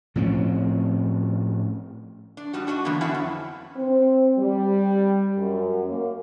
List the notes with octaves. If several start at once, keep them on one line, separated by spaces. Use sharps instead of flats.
A2 F3 C4 C#4
D4
G3 D#4 F#4
D4 F#4 D5 D#5
D3 E3 F#3 A#3 B3
C#4 D4 E4 E5 F#5
F2
C4
G3
F#2
A#3